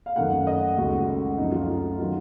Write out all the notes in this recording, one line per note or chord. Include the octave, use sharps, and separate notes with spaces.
F5
F#2 D#3 A3 F#5
D#5
C#2 C#3 A3 F#4
F#2 F3 A3 D#4
F4
D#4
D#3 F#3 F4